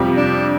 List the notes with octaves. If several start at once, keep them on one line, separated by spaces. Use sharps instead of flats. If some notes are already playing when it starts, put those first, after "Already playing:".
Already playing: F2 C3 G3 C4 F4
D4